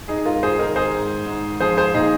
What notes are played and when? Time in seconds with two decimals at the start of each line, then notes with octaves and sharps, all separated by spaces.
0.08 D#4 G#4
0.25 G#2 F4 A#4
0.43 G#4 C5
0.59 D#3 A#4 D#5
0.76 G#4 C5
0.94 G#2
1.26 G#2
1.60 F3 G#4 C5
1.77 G#4 C5
1.94 A#2 D#4 G#4